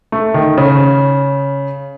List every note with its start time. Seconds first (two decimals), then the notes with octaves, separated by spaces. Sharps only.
0.12 A3
0.34 D#3
0.57 C#3